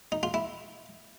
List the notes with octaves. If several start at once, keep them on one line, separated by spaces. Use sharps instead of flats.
D#4
F4
E4